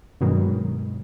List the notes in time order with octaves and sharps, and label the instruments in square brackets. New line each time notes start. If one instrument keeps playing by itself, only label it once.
[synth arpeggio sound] G2 B2 D#3 F#3 G#3